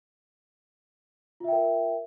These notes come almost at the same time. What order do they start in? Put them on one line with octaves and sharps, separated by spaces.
F4 E5 G5 A#4